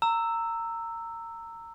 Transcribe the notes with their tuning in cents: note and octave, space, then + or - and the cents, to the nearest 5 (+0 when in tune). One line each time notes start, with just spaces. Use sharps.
A#5 -20 E6 +0